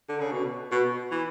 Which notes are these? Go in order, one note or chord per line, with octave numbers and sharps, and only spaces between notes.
D3
C#3
B2
B2
E3